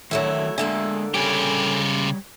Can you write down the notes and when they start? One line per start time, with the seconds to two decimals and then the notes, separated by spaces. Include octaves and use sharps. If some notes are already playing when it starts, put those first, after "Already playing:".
0.11 D#3 E3 F#3 A3 D4 E4
0.58 D3 G#3 A#3 A4 E5 G#5
1.14 C#3 G3 G4 C#5 G#5